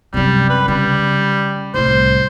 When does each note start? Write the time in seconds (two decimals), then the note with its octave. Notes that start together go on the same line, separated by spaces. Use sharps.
0.14 F#2 C3 G3
0.49 B4
0.68 C#3 G3
1.74 C2 A2 C5